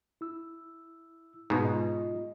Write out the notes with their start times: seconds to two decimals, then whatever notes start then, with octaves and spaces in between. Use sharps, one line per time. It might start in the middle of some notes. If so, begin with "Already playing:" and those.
0.21 E4 E6
1.50 G#2 B2
1.65 F4 D#5